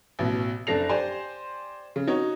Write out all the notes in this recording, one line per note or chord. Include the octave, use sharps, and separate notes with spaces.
A1 B2
F#1 D4 A4 A#6 C7 F7
G4 C5 D5 G#5 C6
C#3
D#4 F#4 C#5